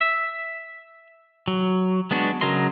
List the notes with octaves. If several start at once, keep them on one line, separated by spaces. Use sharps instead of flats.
E5
F#3
G#3 B3 D4 F#4
C#3 F#3 A#4 D#5 C6